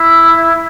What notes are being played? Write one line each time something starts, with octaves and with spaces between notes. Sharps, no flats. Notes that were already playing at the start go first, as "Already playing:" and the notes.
Already playing: E4